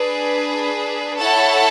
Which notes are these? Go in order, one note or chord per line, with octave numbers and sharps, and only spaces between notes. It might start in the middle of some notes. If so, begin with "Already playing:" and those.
Already playing: D4 G#4 B4
E4 A4 C#5 F#5 A5